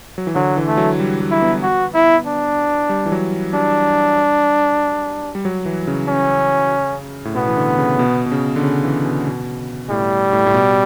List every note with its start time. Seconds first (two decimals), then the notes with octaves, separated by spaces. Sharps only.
0.18 F#3
0.27 E3
0.35 D3 F#3
0.57 E3
0.67 A3
0.77 F#3
1.00 G3
1.20 G3
1.31 E4
1.42 B3
1.63 F#4
1.94 E4
2.27 D4
2.89 G3
3.06 E3
3.12 F#3
3.53 G3 D4
5.35 G3
5.45 F#3
5.66 E3
5.87 C#3
6.08 C#4
7.25 A2
7.35 B2 B3
7.48 E3
7.57 D3
7.78 C#3
7.99 B2
8.26 B2
8.32 C#3
8.56 D3
8.63 C#3
8.84 E3
9.05 B2
9.27 B2
9.90 A2 G3
10.33 A2
10.46 A2
10.54 B2